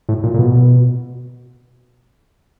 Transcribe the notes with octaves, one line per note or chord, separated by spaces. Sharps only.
A2
A#2
A#2
B2